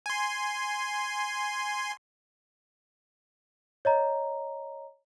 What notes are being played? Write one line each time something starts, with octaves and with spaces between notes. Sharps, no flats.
G#5 C6
C#5 D#5 A#5